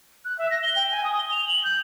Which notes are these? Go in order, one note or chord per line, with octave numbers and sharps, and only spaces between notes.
F#6
E5
A#6
G7
G5
G#5
D#6
G7
F7
F#7
G6